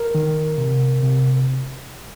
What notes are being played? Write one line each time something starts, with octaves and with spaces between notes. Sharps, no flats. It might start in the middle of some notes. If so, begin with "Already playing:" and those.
Already playing: A#4
D#3
C3
C3